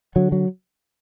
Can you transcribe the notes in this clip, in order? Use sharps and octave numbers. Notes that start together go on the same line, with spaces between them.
D3 F#3
F#3